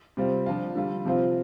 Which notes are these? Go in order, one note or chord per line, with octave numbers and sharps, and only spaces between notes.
C3 G3 C4 F4
F3 D4 F4
D3 G3 F4
C3 F3 C4 F4